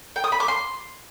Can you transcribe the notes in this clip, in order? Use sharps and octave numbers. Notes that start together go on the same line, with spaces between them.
G5
D#6
B5
D6
C6